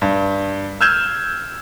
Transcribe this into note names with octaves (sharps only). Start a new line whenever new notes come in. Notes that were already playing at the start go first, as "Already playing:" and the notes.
G2
E6 F6 G6 G#6 E7